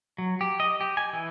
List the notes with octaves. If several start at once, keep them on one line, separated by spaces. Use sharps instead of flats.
F#3
G4
D#5
G4
G#5
E3